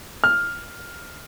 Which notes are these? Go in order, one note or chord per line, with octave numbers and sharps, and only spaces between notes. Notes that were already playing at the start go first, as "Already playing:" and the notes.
F6